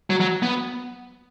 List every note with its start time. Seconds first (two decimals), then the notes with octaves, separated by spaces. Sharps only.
0.10 F#3
0.21 F#3
0.43 B3